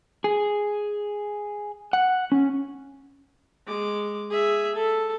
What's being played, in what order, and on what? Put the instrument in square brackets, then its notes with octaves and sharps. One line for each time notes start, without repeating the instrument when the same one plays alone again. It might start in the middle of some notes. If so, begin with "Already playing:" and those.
[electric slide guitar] G#4
F#5
C#4
[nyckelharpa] G#3 D6
G#4 E5
A4